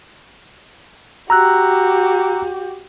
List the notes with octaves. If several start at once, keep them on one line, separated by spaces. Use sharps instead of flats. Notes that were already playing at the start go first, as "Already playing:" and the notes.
F#4 G4 A#5 E6 F#6